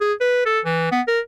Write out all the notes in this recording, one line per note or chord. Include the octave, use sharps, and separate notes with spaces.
G#4
B4
A4
E3
B3
A#4